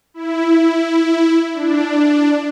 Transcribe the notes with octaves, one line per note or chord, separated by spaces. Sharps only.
E4
D4